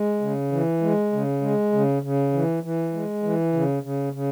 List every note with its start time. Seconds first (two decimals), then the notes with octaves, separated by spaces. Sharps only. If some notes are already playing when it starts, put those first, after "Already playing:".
Already playing: G#3
0.21 C#3
0.52 E3
0.81 G#3
1.12 C#3
1.42 G#3
1.72 C#3
2.02 C#3
2.33 E3
2.63 E3
2.94 G#3
3.23 E3
3.53 C#3
3.83 C#3
4.13 C#3